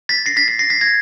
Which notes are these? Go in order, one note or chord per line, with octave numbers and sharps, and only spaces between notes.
A6 B6
A#6 C7
A6 B6
A6 B6
A#6 C7
A6 B6
G#6 A#6